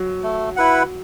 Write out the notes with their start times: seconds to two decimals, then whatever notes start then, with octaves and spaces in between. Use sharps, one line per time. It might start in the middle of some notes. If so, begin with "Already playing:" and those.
Already playing: F#3
0.23 A3
0.56 E4 B4 F#5